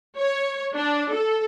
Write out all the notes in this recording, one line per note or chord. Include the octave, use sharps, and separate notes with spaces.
C#5
D4
A4